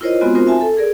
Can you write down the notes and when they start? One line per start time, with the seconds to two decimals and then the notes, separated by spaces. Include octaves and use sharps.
0.01 E4 F4 A#4 C5 C#5 D#5
0.21 G#3 B3 C4 F4 F#4
0.35 C4 D#4 F4 F#4 A#4 C5
0.47 E5 G#5 A5
0.61 A4
0.77 G#4 A#4 D5